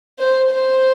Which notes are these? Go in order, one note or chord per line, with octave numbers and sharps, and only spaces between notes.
C5
C5